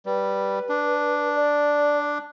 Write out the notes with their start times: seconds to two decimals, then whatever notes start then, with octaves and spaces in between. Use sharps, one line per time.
0.06 G3 B4
0.69 D4
1.36 D5